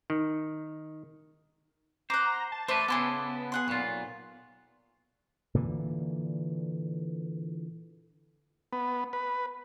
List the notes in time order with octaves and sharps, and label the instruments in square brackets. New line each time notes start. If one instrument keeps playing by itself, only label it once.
[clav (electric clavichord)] D#3
[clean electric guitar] C5 [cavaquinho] F#5 D6 [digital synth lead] A#5
[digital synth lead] A5
[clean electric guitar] A3 A4 B4 [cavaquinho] C5 D5
[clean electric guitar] C#3 E4 A4 [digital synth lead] B3 [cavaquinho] G#4 C6 D6
[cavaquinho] G#4 F#5 C6
[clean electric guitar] B1 A#2 F4 [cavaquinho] C#5 F#5
[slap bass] A#2 D3 E3
[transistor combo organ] B3
B4